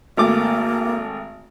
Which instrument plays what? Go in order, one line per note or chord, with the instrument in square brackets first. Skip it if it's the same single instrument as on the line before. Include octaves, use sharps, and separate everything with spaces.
[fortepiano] G#1 A3 D6 [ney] A#3